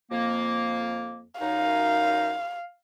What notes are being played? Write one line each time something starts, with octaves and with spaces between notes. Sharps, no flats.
F2 A#3
F#2 D#4 F5